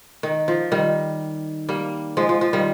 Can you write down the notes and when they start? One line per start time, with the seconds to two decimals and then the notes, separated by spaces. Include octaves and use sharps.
0.23 D#3
0.48 F3
0.72 D#3 G3
1.69 G3 A#3
2.17 F3 G#3
2.29 F3
2.41 F3
2.53 D#3 G3